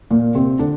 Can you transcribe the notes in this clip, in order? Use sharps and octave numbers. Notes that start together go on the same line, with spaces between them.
A#2 A#3
C3 C4
D3 D4